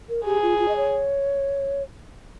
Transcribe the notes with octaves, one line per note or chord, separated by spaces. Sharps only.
A#4
G4 G#4
F4
F4
D#5
C#5